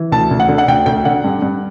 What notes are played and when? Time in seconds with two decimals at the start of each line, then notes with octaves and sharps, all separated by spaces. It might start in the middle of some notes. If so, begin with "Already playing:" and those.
Already playing: E3
0.12 D2 A5
0.31 D2
0.40 F#5
0.49 D3
0.58 F#5
0.68 D2 G5
0.86 D2 G5
1.05 D3 F#5
1.24 G2
1.42 G2